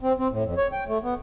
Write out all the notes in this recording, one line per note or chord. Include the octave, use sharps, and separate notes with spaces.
C4
C4
A2
F2
C#5
G5
A3
B3